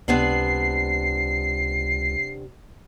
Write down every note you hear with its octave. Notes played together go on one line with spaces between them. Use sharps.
C#2 C3 B3 D4 C7